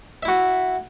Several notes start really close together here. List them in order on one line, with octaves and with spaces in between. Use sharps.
E5 E4 F#4